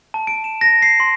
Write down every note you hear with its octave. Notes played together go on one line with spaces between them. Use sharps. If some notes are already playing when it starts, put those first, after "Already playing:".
A5
D7
E7
A#6
C7
C6